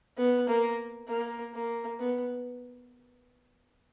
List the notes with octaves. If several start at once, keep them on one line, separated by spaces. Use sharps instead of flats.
B3
A#3
A#3
A#3
B3